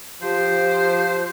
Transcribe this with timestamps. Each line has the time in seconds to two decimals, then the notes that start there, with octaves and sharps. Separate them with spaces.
0.22 F3 G4 C5